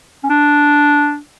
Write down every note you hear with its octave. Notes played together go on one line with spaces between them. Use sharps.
C#4
D4